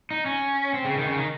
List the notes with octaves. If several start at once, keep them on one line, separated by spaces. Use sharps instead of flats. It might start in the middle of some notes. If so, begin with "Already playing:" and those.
D#4
C#4
C4
C#3
D#3
C#3
D#3